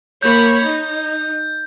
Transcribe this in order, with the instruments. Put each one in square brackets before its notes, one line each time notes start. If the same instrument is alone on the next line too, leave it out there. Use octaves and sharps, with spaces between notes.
[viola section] A#3 C#5 B5 [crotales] G6
[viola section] D#4